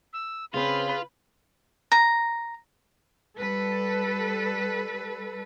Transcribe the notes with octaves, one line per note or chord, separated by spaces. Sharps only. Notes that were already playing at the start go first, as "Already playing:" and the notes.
E6
C#3 C4 C#4 F4 G#4 B4
A#5
G3 A4 B4